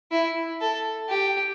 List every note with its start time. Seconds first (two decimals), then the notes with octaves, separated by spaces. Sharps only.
0.11 E4
0.61 A4
1.09 G4